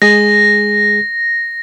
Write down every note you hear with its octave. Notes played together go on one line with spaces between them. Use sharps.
G#3 G#4 A#6